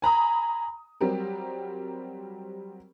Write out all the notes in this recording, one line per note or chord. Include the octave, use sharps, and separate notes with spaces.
G#5 A#5 B5 D#6
F#3 G3 C4 G4 A#4